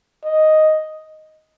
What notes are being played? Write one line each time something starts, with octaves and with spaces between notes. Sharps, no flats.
D#5